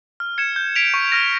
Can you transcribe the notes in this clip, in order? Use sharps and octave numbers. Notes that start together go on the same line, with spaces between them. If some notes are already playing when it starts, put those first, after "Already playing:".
F6
G#6 C#7 E7
G6
B6 D7 F7
C#6
F6 A#6